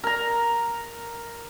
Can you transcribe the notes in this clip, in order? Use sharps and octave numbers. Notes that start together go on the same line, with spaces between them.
A#4 A#5